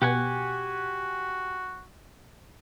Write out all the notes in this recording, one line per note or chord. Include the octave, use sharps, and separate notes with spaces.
B2 F#4 G4 F#5 G#5